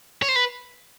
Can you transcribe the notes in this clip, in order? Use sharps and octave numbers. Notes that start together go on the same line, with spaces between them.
C#5
C5
B4